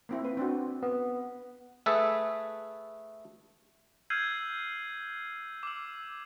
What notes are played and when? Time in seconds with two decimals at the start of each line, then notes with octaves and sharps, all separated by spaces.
0.09 A#3 C4 E4
0.25 B4
0.37 C4 D4 F#4
0.83 B3
1.86 A3 G#4 A4 B4 E5
4.10 E6 F6 G6 G#6 C7 D#7
5.63 D6 E6